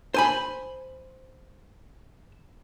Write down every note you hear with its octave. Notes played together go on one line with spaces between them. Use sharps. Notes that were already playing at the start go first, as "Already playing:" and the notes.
C5 G#5 B5